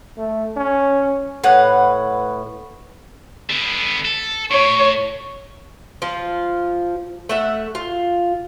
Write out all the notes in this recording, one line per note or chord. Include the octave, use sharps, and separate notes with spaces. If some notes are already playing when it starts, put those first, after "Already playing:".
A3
C#4
A2 B4 F#5
D3 B3
A4
A2 C#5
F3 F4
A3 E5 F#5
F4